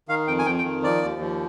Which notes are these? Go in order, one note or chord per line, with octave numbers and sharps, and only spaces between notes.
D#3 F5
F2 G5
G#5
F2 G5
G5
D#3
F3 D5
D#2
F3